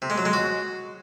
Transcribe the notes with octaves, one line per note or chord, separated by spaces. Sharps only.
C3
G#3
F#3
G#3
F#4